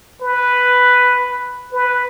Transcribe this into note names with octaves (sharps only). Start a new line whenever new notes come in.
B4
B4